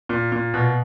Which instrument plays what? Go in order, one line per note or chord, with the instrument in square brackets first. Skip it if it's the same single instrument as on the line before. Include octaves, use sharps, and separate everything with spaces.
[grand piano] A#2
A#2
B2